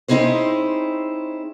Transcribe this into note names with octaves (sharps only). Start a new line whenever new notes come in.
C4 C#4 D#4 E4 G#4 C5